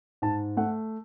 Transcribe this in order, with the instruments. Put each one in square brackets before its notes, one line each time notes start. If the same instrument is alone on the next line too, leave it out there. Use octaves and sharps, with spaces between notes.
[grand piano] G#2 A5
A3 F#5